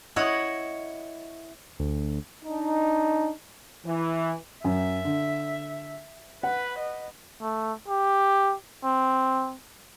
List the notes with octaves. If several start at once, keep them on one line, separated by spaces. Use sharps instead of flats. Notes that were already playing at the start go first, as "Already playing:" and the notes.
E4 C#5 D#5 F#5
D2
D4 D#4
E3
F#2 E5
D3
B4 F#5
D#5
A3
G4
C4